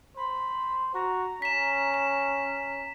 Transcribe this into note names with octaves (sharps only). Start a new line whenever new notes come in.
C5 B5
F#4 A#5
C#4 B6 E7
E7